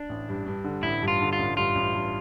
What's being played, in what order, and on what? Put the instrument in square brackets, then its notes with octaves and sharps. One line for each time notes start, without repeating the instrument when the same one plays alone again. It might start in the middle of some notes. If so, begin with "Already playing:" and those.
Already playing: [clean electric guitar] D4
[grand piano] A1
G2
G2
D3
[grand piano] A1 [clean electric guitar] E4
[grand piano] G2
[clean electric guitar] F4
[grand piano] D3
[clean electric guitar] F4
[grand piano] A1
[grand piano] G2 [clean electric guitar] F4
[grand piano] A1
G2